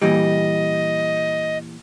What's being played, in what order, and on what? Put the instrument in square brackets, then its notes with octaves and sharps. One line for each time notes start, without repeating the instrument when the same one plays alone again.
[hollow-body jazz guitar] A#2 E3 G3 [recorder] D#5